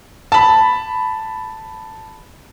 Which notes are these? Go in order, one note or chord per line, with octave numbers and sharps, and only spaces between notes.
A5 B5